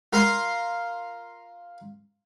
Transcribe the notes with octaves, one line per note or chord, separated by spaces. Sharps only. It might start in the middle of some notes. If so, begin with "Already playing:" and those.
F4 A#4 F5 A#5 C6